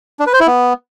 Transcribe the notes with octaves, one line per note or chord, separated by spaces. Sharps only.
D4
B4
C5
E4
B3